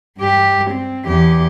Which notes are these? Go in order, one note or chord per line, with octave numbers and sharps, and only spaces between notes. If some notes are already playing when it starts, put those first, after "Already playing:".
G2 G4
C4
E2 G4